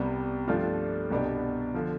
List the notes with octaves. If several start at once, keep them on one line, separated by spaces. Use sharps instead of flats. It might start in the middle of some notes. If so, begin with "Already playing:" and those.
Already playing: C2 C3 G3 B3
G2 F3 A3 D4 F4
C2 B2 B3 D4 G4
D3 F3